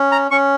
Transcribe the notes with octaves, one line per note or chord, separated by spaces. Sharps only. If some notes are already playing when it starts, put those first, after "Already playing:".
Already playing: C#4
A#5
C#4 C#6